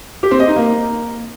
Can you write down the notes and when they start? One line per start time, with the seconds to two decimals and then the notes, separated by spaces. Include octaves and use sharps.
0.23 G4
0.31 C4
0.40 D#5
0.48 D#4
0.56 A#3